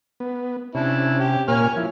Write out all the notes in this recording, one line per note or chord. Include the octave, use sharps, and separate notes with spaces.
B3
C3 C#4 D4 E4
G4
A#2 A#3 C#5 G#5 F6
F3 E4